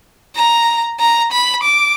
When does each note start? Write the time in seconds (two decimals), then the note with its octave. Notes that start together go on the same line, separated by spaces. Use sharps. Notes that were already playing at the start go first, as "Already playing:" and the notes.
0.36 A#5
1.00 A#5
1.32 B5
1.63 D6